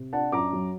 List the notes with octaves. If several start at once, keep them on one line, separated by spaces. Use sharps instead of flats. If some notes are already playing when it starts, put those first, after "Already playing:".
Already playing: C3
D4 F#5 A5
F#2 A#5 D6
F#3